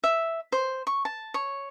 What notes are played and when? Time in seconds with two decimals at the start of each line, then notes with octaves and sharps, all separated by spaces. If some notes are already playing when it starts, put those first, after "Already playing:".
0.04 E5
0.52 C5
0.87 C#6
1.05 A5
1.34 C#5